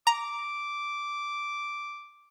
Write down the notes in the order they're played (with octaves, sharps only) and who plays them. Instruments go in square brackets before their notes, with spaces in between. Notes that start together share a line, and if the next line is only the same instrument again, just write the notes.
[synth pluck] A#5 [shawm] D6